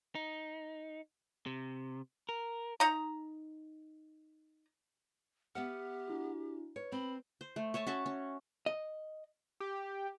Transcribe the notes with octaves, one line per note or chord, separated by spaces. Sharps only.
D#4
C3
A#4
D#4 A#5
B3 G4 E5 F#5 F6
D4 E4 F#4
B4 C#5
C4 B5
C5
A3
C#5 E5 G#5 A5
C#4 F#4 E5 A5
C#4
D#5
G4